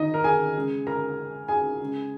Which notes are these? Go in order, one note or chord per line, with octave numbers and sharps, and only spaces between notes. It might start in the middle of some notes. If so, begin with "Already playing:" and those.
Already playing: D#3 D#4 D#5
A#4
G#4 G#5
C#3 G#3
A#4 A#5
G#4 G#5
C#3 G#3